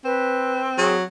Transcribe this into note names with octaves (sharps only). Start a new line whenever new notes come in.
C4 B4
F#3 G#4